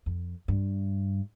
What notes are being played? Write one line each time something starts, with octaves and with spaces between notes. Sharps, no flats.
F2
G2